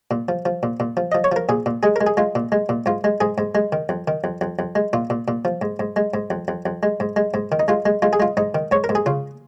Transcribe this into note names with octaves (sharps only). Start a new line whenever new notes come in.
A#2
F3
F3
A#2
A#2
F3
F3 D#5
C#5
F3 A#4
A#2 G#4
A#2
G#3 G#4
G#3 A#4
G#4
G#3 F4
A#2
G#3
A#2
G#2 F4
G#3
G#2 G#4
G#2
G#3
D#3
F2
D#3
F2
F2
F2
G#3
A#2 F4
A#2
A#2
F3
G#2
G#2
G#3
G#2
F2
F2
F2
G#3
G#2
G#3
G#2
D#3
D#4
G#3 F4
G#3
G#3 F4
G#4
G#3 F4
G#2 D#4
D#3
G#2 C#5
A#4
G#2
G#4
C#3 F4